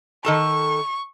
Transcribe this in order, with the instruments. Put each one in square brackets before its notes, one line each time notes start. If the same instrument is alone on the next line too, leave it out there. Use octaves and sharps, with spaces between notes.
[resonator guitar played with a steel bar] D#3 A4 A5 [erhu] C#6